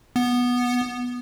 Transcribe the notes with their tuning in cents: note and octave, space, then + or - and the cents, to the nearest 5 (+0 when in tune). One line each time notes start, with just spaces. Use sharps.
B3 -10